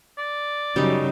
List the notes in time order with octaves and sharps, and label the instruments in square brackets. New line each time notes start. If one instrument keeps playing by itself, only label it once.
[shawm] D5
[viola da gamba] F#2 C#3 F#3 [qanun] G3 D#4